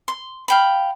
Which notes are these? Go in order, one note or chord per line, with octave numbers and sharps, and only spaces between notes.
C6
F5 G5 B5